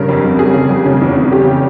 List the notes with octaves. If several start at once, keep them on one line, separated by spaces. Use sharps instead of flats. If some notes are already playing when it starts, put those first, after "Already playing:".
Already playing: G2 C#3 A#4
F2
F2
G3 G#4
C#3
F2
C#3
E2
E2
G3 G4
C#3